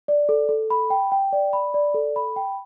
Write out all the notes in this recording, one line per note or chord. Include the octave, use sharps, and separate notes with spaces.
D5
A4
A4
B5
G5
G5
D5
B5
D5
A4
B5
G5